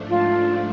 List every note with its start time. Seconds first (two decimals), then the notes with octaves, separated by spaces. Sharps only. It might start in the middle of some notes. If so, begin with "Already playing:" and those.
Already playing: G#2 F3 A3 D4
0.10 F4